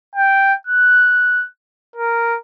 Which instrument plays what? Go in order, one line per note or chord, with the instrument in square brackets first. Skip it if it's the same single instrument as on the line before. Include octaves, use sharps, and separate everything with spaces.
[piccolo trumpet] G5
F#6
A#4